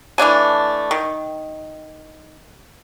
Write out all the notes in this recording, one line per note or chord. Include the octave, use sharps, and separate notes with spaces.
E3 A3 D4 G#5
D#3